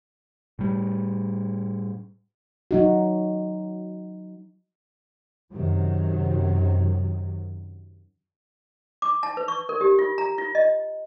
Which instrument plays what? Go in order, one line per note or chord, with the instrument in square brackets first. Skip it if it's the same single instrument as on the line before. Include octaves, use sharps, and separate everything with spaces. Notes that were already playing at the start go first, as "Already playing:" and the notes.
[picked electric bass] A2 G3
[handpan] F#3 D#4 F#4
[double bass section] F#2 C3 D#3 F#3
[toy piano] D6
A5
B4
C#6
A#4
G4
F4
A#5
F4
D#5